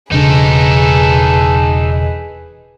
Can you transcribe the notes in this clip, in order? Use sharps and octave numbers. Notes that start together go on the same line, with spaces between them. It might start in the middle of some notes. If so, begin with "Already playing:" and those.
E1 C#3 D4 D#4 G#4 A4 B4